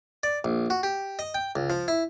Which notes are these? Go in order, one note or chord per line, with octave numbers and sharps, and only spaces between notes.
D5
A#1
F#4
G4
D#5
G5
C#2
F3
E4